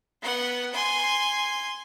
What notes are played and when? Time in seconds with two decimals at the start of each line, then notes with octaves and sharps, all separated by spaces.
0.22 B3 F#5
0.72 G#5 C6